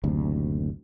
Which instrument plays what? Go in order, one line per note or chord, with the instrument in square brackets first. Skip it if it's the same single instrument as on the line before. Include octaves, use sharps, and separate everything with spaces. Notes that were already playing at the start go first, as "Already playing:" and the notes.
[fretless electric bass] F#1 D2 C3